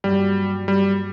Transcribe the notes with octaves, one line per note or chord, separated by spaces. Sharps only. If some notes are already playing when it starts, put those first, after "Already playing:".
G2 F#3 G3 A#3 F#4
G3